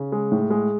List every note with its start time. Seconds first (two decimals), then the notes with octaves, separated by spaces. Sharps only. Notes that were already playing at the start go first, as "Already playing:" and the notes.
Already playing: C#3
0.12 G#3
0.32 A2
0.50 G#3